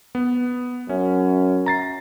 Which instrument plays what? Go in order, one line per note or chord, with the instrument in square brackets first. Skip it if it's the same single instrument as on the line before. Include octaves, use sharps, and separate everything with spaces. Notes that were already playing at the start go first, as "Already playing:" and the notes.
[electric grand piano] B3
[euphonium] F#2 [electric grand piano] C#4
[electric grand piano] A#5 A6 C7